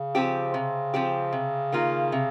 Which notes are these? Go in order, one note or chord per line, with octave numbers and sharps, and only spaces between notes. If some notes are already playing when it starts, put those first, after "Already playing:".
Already playing: C#3
F3 C4 G4
C3
F3 C4 G4
C3
D#3 A#3 F4
C3